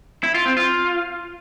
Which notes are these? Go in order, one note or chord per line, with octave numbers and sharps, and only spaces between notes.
E4
F4
C4
F4